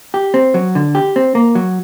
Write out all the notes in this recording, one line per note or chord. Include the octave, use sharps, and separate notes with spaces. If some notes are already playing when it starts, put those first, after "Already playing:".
G4
C4
F#3
D3
G4
C4
A#3
F#3